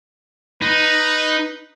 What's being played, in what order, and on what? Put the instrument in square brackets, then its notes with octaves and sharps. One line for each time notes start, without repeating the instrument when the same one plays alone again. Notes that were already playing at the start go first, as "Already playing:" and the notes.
[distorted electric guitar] D#4 [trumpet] B4